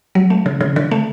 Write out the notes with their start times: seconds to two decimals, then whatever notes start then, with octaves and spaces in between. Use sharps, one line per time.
0.15 F#3
0.30 A3
0.46 C#3
0.61 C#3
0.76 D3
0.91 A3